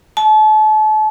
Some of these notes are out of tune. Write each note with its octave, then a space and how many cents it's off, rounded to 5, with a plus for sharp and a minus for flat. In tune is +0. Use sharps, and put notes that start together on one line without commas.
A5 -35